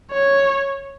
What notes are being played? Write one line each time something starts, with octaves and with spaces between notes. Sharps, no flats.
C#5